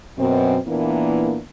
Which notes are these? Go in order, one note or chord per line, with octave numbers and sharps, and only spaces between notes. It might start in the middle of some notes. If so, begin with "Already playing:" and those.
F#2 B2 C4
A#2 E3 A#3 B3 D4 E4